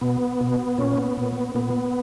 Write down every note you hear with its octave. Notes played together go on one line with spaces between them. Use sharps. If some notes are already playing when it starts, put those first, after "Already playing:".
B2 B3
B2
A#2 C#4
B3
A#2
A#2 B3